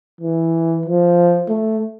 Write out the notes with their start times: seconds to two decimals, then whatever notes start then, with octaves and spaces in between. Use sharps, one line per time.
0.21 E3
0.85 F3
1.49 A3